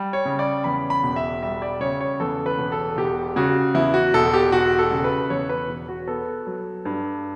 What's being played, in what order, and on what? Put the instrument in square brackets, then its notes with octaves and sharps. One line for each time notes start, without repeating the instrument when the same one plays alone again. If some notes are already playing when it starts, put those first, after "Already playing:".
Already playing: [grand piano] G3
C#5
C#3
D5
E2 B5
B5
E1
E5
G3 E5
D5
C#3 C#5
C#5
E2 A4
B4
E1
A4
E1 G4
C#3 F#4
E2 E4
F#4
E1 A4
G4
E1 F#4
A4
C#3
B4
E2 C#5
B4
E1
F#4
B3 A4
F#3
G2